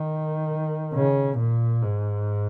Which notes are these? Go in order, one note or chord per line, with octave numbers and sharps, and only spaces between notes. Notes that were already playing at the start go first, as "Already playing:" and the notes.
Already playing: D#3
C#3
A#2
G#2